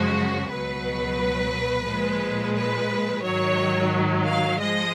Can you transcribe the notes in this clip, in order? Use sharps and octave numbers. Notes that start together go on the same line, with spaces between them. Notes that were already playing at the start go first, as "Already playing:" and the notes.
Already playing: F#2 C#3 F3 G#3 F#4
C#2 B2 F#3 B4
A#2 F3 G#3
B4
G#2 D#3 F#3 C#5
F5
F3 G#3 D#5